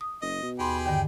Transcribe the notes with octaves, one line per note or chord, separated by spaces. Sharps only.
D#6
F#1 D#5
B2
D#2 G4 G#4 B5 C6
G2 D3 D#3 G5